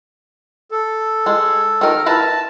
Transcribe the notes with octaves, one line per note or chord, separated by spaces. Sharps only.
A4
G#3
D#3 A#4
E4 B4 A5 A#5